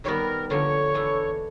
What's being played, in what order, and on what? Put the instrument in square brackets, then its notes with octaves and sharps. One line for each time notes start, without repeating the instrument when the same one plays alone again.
[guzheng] D#3 G3 B3 [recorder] A#4 C#5
[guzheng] D3 F3 A#3 [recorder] C#5
[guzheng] E3 A3 D4